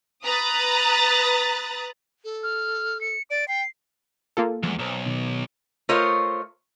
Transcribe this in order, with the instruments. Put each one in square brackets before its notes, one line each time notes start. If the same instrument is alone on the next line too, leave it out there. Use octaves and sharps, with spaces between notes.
[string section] B4 A#5 D#6 F#6 A6
[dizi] A4
[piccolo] F6
C#7
[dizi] D5 [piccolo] D7
[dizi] G5 [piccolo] C7
[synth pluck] A#3 F4 A4
[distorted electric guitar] E2 [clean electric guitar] F3 G#3
[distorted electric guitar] B1 [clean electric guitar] C5 A#5
[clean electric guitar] B2 D#3
[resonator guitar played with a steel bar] A3 F4 A#4 C5 C#5 D#5